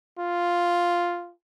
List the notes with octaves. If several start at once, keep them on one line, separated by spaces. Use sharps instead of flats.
F4